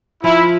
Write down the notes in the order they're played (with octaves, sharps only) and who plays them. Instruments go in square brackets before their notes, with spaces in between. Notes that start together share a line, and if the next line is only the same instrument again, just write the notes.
[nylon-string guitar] F3 [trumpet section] E4